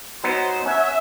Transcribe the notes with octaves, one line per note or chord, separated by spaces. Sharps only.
F#3 B3 D#4 C5
C#4 E5 F#5